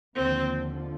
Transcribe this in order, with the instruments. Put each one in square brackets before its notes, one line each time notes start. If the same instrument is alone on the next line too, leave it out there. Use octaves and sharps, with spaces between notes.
[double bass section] D#2 D3 F3 [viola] C4